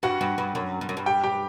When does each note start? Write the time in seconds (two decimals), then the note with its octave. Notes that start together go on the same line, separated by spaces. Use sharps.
0.03 G2 F#4 F#5
0.21 G2
0.38 G2
0.55 F#2
0.81 G2
0.89 F#2
0.97 G2
1.06 G4 G5
1.23 G4 G5